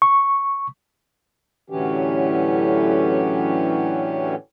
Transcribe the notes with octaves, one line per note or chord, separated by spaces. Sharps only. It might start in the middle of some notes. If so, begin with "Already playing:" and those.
C#6
A2 D3 E3 F#3 C#4 G4